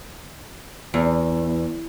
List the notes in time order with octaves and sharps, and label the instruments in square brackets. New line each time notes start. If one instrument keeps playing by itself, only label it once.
[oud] E2